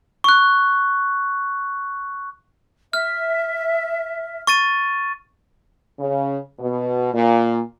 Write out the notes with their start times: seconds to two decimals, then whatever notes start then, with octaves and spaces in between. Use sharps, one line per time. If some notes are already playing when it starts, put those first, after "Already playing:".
0.24 C#6 F#6
2.93 E5 F6
4.47 C#6 A6 D#7
5.99 C#3
6.59 B2
7.13 A#2